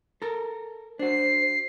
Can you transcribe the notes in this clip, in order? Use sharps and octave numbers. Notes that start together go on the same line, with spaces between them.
A4 A#4
D4 F#4 C5 C7